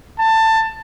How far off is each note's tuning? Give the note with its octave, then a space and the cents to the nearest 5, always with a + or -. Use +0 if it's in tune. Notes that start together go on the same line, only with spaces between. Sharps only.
A5 +15